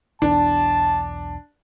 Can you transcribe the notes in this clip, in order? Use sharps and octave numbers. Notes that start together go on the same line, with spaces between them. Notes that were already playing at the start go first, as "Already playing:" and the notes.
B1 E2 D4 A5